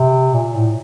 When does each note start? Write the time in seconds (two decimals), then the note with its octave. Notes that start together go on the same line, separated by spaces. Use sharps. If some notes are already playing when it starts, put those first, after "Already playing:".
Already playing: C3
0.34 A#2
0.55 A2